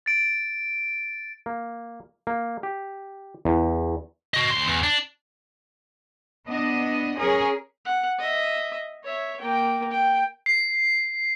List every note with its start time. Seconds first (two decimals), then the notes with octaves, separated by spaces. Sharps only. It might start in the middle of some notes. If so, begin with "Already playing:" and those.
0.06 A6 D7
1.46 A#3
2.27 A#3
2.63 G4
3.45 E2
4.34 F#4 D#5
4.50 D2 C6
4.68 E2
4.83 D4
6.46 B3 D4 D#5
7.17 C#4 G#4 A#4 C#5
7.85 F#5
8.19 D#5 E5
9.04 C#5 E5
9.40 A#3 G5
9.91 G5
10.46 C7